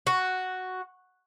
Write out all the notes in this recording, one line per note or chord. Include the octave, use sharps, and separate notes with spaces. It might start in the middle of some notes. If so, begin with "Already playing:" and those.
F#4